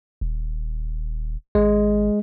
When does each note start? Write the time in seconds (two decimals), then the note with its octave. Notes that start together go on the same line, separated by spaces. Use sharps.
0.21 D#1
1.55 G#1 G#3